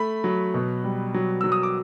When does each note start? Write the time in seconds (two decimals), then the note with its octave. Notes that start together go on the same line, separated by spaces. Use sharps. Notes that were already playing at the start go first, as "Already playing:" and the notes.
Already playing: A3 B5
0.24 F#3
0.54 B2
0.84 G3
1.14 F#3
1.41 F#3 E6
1.52 D#6
1.63 D6